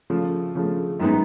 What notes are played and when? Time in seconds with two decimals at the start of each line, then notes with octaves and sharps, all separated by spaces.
0.10 C#3 F3 A3
0.55 C#3 F3 A3
1.00 F#2 D#3 G#3 B3 D#4